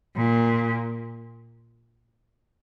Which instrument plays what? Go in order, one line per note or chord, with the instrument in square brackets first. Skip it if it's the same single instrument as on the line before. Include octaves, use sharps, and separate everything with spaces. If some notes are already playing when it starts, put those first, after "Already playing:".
[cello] A#2